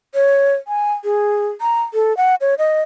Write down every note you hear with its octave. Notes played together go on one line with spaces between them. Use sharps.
C#5
G#5
G#4
A#5
A4
F#5
C#5
D#5